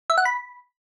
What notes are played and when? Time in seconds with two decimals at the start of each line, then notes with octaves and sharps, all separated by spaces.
0.10 E5
0.18 F#5
0.25 B5